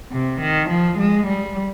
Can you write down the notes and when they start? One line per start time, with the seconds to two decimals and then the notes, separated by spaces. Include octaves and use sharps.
0.13 C3
0.41 D#3
0.70 F3
0.99 G#3
1.27 G3